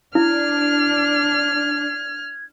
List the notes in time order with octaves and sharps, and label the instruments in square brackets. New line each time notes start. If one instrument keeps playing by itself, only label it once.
[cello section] D4 [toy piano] E4 [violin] F6 [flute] G#6